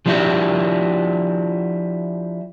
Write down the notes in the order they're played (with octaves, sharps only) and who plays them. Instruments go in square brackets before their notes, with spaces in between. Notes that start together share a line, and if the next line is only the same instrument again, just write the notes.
[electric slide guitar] F3 G#3 D4 E4 F#4 G4